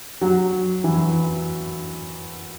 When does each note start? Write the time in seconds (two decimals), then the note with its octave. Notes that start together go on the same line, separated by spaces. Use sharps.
0.21 F#3
0.84 E3